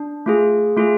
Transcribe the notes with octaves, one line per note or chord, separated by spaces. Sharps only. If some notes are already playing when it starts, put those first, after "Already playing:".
Already playing: D4
A3 F4 G#4
A3 F4 G#4